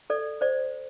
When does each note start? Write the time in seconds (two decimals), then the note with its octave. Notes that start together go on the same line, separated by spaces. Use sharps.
0.10 A4 D5
0.41 C5 D5